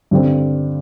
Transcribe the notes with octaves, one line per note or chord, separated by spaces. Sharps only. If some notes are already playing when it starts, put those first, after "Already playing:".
G2 D3 C4